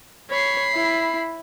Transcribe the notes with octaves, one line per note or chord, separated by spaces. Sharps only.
C#5 B5 C7
E4